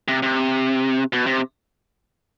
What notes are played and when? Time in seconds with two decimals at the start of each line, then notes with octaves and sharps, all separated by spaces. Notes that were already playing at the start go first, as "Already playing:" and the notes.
0.08 C3
0.23 C3
1.13 B2
1.27 C3